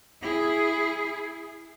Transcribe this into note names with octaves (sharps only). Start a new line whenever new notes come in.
E4 G#4